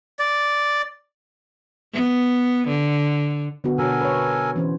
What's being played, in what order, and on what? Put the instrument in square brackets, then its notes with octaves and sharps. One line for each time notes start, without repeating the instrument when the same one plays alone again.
[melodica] D5
[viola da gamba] B3
D3
[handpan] D3 B3 F#4
[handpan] B2 F#4 C#5 [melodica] A4 A#4 G#5
[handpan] B4 C#5
E3 C#4 C5